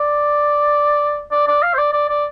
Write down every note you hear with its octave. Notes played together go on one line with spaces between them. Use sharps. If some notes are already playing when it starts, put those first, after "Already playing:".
Already playing: D5
D5
D5
F5
C5
D5
D5
D5